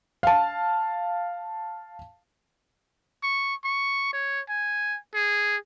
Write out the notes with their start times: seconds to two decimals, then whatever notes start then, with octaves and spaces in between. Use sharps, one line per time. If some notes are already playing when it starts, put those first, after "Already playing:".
0.23 F5 A5
3.23 C#6
3.64 C#6
4.13 C#5
4.49 G#5
5.14 G#4